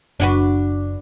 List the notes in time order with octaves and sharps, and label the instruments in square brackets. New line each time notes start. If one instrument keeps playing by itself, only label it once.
[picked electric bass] F#1 [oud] D4 F#4 B4